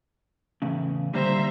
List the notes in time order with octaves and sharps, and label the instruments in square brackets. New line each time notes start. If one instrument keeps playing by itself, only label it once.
[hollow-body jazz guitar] E2 A2 C#3
[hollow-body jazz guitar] A#2 D3 G3 [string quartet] C5 E5 A#5